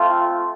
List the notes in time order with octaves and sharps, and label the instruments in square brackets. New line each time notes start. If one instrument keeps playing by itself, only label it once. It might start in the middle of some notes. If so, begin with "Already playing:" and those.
Already playing: [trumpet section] A3 C4 F4